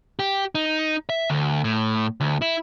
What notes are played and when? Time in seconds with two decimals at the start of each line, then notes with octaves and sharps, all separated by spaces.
0.19 G4
0.55 D#4
1.09 E5
1.30 D2
1.64 A2
2.21 D2
2.42 E4